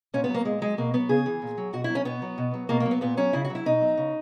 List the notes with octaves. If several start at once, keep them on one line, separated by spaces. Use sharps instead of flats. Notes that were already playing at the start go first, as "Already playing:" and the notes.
A#2 C#4
B3
F#3 A#3
A#2 G#3
F#3 G#3
B2 A#3
F#3 B3
C#3 G#4
E3
A#2
F#3
B2 F#4
E4
F#3
C#4
B2 B3
F#3
B2
F#3
B2 A#3
A#3
F#3
B3
A#2 B3
F#3 C#4
C#3 E4
F#4
F#3
E4
B2 D#4
F#3
C#3